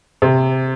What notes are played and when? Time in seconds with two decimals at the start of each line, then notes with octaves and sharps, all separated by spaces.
0.22 C3